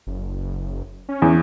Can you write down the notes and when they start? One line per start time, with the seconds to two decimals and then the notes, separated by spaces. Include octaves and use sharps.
0.07 F#1
1.09 C#4
1.22 E2